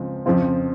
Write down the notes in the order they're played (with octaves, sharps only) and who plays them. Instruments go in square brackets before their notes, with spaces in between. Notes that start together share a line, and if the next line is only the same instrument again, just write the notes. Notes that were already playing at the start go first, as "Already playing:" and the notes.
Already playing: [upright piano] C#2 C#3 F3 G#3 C4
F2 C#3 F3 C4 F4